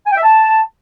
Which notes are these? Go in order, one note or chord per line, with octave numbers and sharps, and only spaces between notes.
G#5
G5
E5
A5